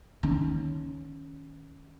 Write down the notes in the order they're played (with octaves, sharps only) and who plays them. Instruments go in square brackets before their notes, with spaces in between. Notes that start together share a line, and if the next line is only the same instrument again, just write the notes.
[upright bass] D#3 C#4